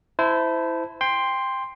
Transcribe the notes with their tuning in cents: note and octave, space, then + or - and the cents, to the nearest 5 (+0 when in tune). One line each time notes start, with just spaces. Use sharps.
E4 +0 C5 -25 A5 +0
G5 +20 C6 +0